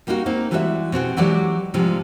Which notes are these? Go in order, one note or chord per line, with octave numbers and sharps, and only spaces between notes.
G3 A#3 D#4 F4 F#4
A#3 C4 D#4
E3 G3 G#3 F#4 C#5 E5
B2 C4 F#4 G#4
E3 F#3 G#3 F#4 G4 D5
G#2 C3 F3 G3 G#3